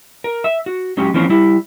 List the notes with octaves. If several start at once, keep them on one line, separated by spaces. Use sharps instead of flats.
A#4
E5
F#4
F#3 G#3 C#4 G4
E3 F3 A#3 C4 C#4
G3 E4